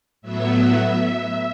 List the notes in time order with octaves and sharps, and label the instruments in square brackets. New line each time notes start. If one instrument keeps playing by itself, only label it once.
[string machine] A2 F#3 B3 E5